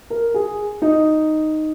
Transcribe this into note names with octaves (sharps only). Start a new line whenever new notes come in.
A#4
G#4
D#4